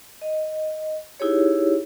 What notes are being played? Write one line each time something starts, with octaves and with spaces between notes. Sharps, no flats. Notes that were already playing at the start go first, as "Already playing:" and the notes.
D#5
D#4 E4 G4 G#4 C#5